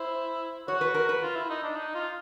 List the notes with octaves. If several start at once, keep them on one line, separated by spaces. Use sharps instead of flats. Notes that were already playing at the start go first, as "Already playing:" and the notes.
Already playing: E4 C5
F#4 C#5
B4
A#4
B4
F4
E4
D#4
D4
D#4
F4